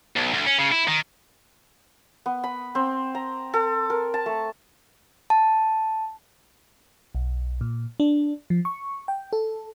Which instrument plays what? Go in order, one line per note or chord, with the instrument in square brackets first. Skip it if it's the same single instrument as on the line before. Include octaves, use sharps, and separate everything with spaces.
[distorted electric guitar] B1
D2
C#4
C#3
E4
D#3
[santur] B3
B5
C4
A#5
A4
A#4
A5
A3
[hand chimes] A5
[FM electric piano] B1
A#2
D4
F3
C#6
G5
A4